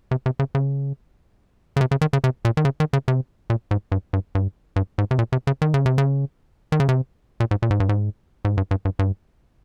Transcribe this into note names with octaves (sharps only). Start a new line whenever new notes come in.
C3
C3
C#3
C#3
C#3
C3
C#3
D#3
C#3
C3
A#2
D#3
C#3
D#3
C#3
C3
A#2
G#2
G2
G2
G2
G2
G#2
C3
A#2
C3
C#3
D#3
C#3
C3
C#3
D#3
C#3
C3
A#2
G#2
A#2
G#2
G2
G#2
G#2
G2
G2
G2
G2